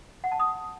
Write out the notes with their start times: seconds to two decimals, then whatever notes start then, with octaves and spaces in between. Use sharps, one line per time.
0.24 F#5
0.32 A5
0.40 D#6